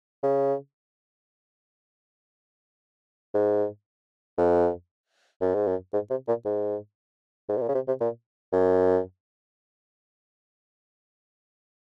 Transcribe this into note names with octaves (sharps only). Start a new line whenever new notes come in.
C#3
G#2
F2
F#2
G#2
F#2
G#2
C3
A#2
G#2
G#2
C3
A#2
C#3
C3
C3
A#2
F#2